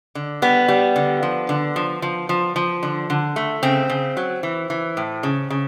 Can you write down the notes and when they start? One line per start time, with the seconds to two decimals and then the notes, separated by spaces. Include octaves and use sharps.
0.15 D3
0.42 G3 B3
0.68 G3
0.96 D3
1.23 F3
1.49 D3
1.76 F3
2.02 F3
2.29 F3
2.56 F3
2.83 D3
3.10 D3
3.36 A3
3.63 C#3 C4
3.89 C#3
4.17 F#3
4.43 E3
4.70 E3
4.97 A2
5.23 C#3
5.50 C#3